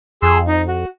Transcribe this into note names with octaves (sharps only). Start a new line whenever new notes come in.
F2 G#4 C6 E6
D#4
F#4